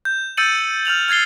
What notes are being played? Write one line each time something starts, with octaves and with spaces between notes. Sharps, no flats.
G6
E6 G6 A6 C#7 D#7 F#7
F6 G6 F7 F#7
F6 G#6 A6 C7 G7